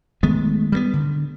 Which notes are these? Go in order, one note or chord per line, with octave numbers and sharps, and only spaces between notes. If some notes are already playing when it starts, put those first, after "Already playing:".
D#3 G#3 A3 B3
G3 A3 B3
D3